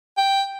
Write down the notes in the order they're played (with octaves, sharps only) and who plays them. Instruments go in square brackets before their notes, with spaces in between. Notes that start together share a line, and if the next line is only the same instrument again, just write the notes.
[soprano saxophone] G5